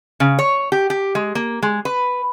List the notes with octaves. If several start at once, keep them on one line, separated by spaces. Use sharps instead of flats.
C#3
C#5
G4
G4
G#3
A#3
G#3
B4